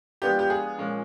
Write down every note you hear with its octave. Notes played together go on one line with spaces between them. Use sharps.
F3 G#3 B3 D4 F4 G4
G4
G#4
A#2 F3 G#3 C#4